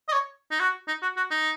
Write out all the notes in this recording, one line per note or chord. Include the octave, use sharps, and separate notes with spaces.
D#5
C#5
D#4
F#4
D#4
F#4
F#4
D#4